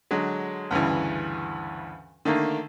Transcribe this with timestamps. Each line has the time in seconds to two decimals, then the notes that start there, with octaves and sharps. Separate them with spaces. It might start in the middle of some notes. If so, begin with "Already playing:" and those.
0.11 D3 F#3 G#3
0.71 D2 G2 C#3 E3
2.25 D3 D#3 A3 A#3